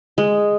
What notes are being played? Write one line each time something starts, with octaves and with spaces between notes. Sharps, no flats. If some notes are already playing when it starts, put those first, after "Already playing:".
G#3